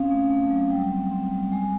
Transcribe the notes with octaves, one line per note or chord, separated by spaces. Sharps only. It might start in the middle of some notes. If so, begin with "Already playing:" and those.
Already playing: C4 C#4 F5
A3
A3
F#3
G3 G5
C4
C4
G3
G#3 G#5